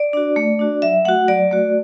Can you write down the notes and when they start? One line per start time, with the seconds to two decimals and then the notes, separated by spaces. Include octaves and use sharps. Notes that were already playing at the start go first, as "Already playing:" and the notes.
Already playing: D5
0.13 D4 F#4
0.36 A3
0.59 D4 F#4
0.82 F#3 E5
1.05 A3 F#4 F#5
1.28 F#3 D5
1.51 A3 F#4